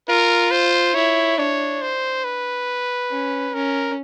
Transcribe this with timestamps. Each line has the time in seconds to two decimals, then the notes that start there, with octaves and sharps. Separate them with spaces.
0.08 F4 A#4
0.51 C5
0.95 E4 C#5
1.38 D4 C#5
1.82 C5
2.24 B4
3.11 C#4
3.54 C#4 A#4